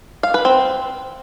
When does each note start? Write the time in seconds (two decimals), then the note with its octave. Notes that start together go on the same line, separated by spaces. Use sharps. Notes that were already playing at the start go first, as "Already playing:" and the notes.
0.23 F5
0.34 B4
0.45 C4